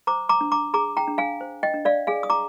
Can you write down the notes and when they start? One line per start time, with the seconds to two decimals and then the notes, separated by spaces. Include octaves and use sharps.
0.07 C5 A#5 D6
0.29 A#5 D6
0.41 D4
0.52 A#5 D6
0.74 G#4 A#5 D6
0.97 G5 A#5
1.08 D4
1.18 F5 G#5
1.41 C5
1.63 D#5 G5
1.74 D4
1.85 D5 F5
2.07 G#4 F5 G#5
2.23 D#6
2.30 A#5 D6